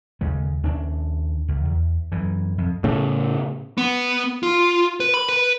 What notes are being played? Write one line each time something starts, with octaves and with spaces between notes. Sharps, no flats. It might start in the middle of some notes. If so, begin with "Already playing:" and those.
D#2 C#3 G#3
D#2 C#4 D4
C#2
E2
F#2 E3
F2
A2 C#3
B3
F4
B4
B5
B4